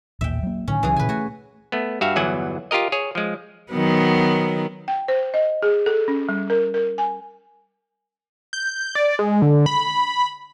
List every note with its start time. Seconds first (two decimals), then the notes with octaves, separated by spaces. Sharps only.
0.21 A1 D#2 A#2 E5 G5
0.43 F#3 A#3
0.68 A2 D3 D#3 C#4
0.83 C#2 C#3 E3 F#3 G#4
0.97 A#2 C#3 B4 G#5
1.09 A3 F#4 G#5
1.72 A3 B3
2.01 G2 F#4 E5 F5
2.16 G1 E2 E3 F#3 F#5 G#5
2.71 F4 G4 A#4 D#5
2.92 G#4 C#5
3.15 F3 G#3
3.72 D#3 F#3 B3
4.88 G5
5.08 C5
5.34 D#5
5.63 G#4
5.86 A4
6.08 C#4
6.29 G3
6.50 A#4
6.74 A#4
6.98 G#5
8.53 G6
8.95 D5
9.19 G#3
9.42 D3
9.66 B5